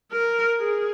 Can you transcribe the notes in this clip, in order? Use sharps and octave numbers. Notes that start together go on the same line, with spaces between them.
A#4
G#4